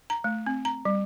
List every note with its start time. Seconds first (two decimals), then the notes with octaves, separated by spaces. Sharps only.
0.10 A#5
0.24 A3
0.47 C4
0.65 A#5
0.85 G3